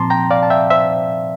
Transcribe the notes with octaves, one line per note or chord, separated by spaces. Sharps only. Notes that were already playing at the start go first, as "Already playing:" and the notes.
Already playing: A#2 F3 C4 A5 A#5 C6 D6
G5 A#5
D5 F5
A5
E5 G5
C5 E5